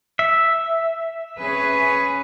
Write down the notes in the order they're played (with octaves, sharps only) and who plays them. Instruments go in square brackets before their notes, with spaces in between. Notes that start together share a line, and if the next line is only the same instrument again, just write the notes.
[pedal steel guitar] E5
[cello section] C#4 G#4 B4